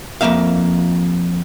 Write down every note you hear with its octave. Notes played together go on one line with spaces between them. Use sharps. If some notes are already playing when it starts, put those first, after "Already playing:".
F2 F#3 A#3 E5 F5